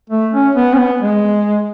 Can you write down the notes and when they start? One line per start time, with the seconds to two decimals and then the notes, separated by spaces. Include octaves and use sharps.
0.10 A3
0.33 C#4
0.55 B3
0.73 C#4
0.78 B3
1.01 G#3